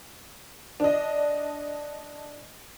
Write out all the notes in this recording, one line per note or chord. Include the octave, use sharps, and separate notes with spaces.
D4 D#5